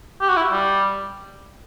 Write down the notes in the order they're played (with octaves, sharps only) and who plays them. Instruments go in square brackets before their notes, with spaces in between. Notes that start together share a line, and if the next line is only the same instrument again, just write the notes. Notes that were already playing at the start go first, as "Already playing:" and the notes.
[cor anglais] G4
F#4
E4
G3